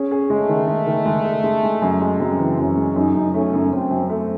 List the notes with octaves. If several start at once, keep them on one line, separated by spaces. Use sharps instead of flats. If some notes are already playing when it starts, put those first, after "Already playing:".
Already playing: C#4 G#4
G#4
G#3 A3
D#3
G#3
D#3
G#3
G#4
G#3
G#3
F#2
G#3
F#2 C4
E3
F#2 C#4
G#3
F#2 D#4
F#2
A3 C#4
F#2
F#2 C4
F#2
A3